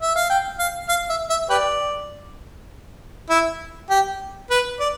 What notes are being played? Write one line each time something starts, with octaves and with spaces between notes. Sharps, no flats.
E5
F5
G5
F5
F5
E5
E5
G4 B4 D5
E4
G4
B4
D5